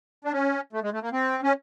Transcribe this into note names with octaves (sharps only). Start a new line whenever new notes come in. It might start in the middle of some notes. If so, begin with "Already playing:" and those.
D4
C#4
A3
G#3
A3
A#3
C4
C#4